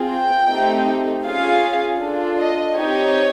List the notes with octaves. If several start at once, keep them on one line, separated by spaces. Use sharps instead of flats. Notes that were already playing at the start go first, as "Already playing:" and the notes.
Already playing: C4 F4 G#4
G5
A3 C4 D#4 G4
C#4 F4 G#4 F5
D4 F4 A4
D#5
C4 D#4 G4 C#5